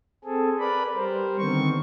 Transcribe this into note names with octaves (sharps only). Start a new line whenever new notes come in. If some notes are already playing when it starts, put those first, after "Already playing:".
C4 G#4 A4
A#4 B4 D5 B5
G3 A#4 C5
D3 D#3 B3 C4 C#6